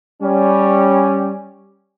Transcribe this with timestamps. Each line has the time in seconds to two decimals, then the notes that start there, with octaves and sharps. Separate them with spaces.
0.22 G3 C#4